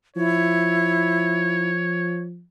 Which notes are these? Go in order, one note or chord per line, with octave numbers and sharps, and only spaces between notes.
F3 E4 C#5